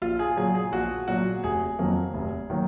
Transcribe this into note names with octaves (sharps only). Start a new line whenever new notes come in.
A#1 F4
G#4
A#2 F#3 G#4
G#4
A#1 F#4
A#2 F#3 F#4
F1 G#4
F2 D#3 F#3 A#3
F1
D#3 F#3 A#3